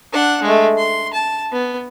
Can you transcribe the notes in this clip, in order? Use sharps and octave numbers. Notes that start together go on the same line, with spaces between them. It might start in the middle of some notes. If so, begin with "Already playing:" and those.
D4 F#5
G#3 A3
C6
A5
B3